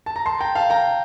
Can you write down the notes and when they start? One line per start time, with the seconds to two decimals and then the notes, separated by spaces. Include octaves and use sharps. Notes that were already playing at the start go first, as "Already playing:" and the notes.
0.06 A5
0.16 A#5
0.26 A5 C6
0.41 G5 A#5
0.55 F5 A5
0.70 G5 A#5